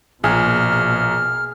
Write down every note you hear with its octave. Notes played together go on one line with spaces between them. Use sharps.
A#1 B2 A#3 G#4 F6